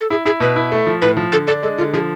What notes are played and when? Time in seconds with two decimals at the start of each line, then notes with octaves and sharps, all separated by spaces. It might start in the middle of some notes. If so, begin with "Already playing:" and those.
0.01 A4
0.10 E4 G#4
0.25 E4 G#4
0.40 B2 B4
0.56 E4
0.72 A3
0.86 F3
1.02 A2 B4
1.17 F3
1.32 D3 A4
1.47 D4 A4
1.63 G#3 A4
1.78 D3 F4
1.93 F3 G#4